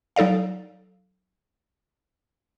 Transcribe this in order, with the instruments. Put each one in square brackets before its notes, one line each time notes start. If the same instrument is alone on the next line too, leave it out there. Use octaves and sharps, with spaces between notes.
[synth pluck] F#3 D#4 A4 D5 F5